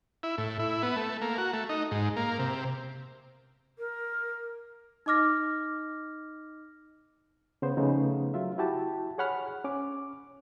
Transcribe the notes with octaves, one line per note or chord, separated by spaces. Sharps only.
E4
A2
E4
B3
A3
A#3
F#4
A3
D#4
G#2
A#3
C3
A#4
D#4 D#5 D6 F6 A#6
C#3 B3 C5
C#3 F3 A3 B3 C#4 D#4
F#3 F4 E5
E4 F#4 G4 A5
G#4 C#5 F#5 B5 F6
C#4 D6